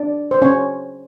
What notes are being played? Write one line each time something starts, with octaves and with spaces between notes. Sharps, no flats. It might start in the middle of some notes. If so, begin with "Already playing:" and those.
Already playing: D4 D5
C5
C#4 C#5